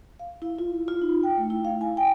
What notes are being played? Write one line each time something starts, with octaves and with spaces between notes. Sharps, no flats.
F5
E4
F4
F4
D#4
G5
A3
E4
F5
G#5
G5